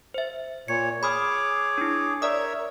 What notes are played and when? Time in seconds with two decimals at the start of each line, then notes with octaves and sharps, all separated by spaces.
0.14 C5 E5
0.68 A#2 C#5 C#7
1.03 G#4 C#5 B5 D6 D#6 F6
1.78 D4 E4
2.22 A#4 C#5 D5 E5 D#6